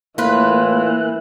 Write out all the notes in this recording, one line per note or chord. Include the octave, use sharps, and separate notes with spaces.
A2 E3 A#3 F4 B4 F#6